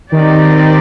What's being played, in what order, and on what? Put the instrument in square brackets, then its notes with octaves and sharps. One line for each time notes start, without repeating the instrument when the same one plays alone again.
[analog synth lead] D#3 [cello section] C4 D#4 G4 D5